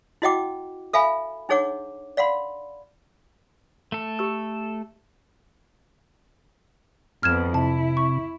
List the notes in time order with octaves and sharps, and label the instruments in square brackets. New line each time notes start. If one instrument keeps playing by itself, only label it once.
[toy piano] E4 F#4 D#5 F#5 G5 D6
A4 E5 F5 G#5 B5
D4 D#4 G#4 C#5 F#5 D6
D5 F5 F#5 B5 C6
[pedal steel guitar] A3 A4
[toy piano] G4 E6
[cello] F2 B3 [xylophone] F6 G#6 E7
[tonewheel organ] C3 [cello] E4 [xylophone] A5
[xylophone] C#6